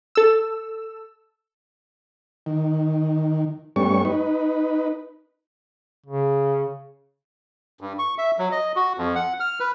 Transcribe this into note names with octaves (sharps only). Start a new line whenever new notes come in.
A4 E6
D#3
G2 G3 A3 B3 C#4 C#6
D#4 B4
C#3
G2
C#6
E5
F#3
D#5
F#4
F2
F#5
F6
B4